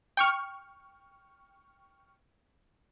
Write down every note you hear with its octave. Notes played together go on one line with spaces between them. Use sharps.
G5 C#6 F6